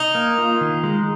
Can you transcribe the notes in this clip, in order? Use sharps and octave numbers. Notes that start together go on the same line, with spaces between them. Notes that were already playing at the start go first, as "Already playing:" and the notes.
Already playing: D#4
A#3
F4
D#3
G#3